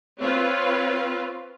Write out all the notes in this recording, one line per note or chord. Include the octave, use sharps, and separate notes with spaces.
C4 F4 B4 C#5